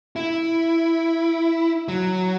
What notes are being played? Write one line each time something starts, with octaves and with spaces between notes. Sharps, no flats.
E4
F#3